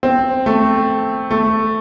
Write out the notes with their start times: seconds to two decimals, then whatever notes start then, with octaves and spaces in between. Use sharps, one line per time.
0.03 C4
0.46 A3
1.31 A3